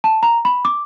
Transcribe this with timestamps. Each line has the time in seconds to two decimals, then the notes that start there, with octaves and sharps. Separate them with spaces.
0.04 A5
0.23 A#5
0.45 B5
0.65 D6